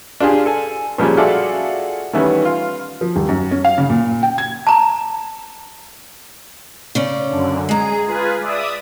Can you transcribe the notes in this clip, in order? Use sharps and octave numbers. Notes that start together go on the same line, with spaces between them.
D4 F4 G4 G#4
A4 G#5
A#2 F3 G3 G#3 C#4
F4 F#4 G#4 A4 D5 E5
D#3 E3 G3 A3 B3 C#4
F4
F3
D#1
F#2
C#4
F5
C#3
A#2
G5
G#6
A5 A#5
C#3 C#4 D5
F#2 D3
G#3 G#4 A#5
F4 G#4 B4
D5 E5 D#6